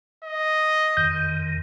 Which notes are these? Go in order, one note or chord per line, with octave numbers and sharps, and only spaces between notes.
D#5
F2 D#3 G6